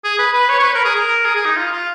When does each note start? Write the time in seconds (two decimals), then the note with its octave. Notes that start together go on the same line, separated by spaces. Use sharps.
0.04 G#4
0.19 B4
0.33 B4
0.49 C#5
0.60 C#5
0.64 B4
0.75 A#4
0.85 G#4
0.95 A#4
1.25 G#4
1.35 G#4
1.46 D#4
1.57 F4
1.72 F4